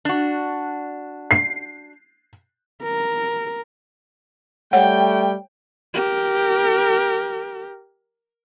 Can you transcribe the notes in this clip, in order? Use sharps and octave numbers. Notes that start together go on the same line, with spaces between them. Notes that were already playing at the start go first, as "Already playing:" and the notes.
D4 F#4
C7
A#4
G3 A3 C#5 F#5 G5
G4 A#4